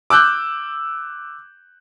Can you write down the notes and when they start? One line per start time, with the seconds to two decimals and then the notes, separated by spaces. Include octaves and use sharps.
0.10 D6 E6 F#6 G6